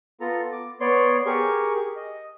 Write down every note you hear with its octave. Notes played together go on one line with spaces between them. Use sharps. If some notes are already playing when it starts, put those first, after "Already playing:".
B3 F4 A4 A#5
D6
B3 C#5 D5 C6
G4 G#4 A#4 C#6
D#5